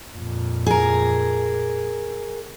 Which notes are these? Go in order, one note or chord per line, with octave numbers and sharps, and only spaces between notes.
F2 A#2
G#4 A#4